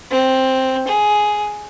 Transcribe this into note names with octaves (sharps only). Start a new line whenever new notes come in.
C4
G#4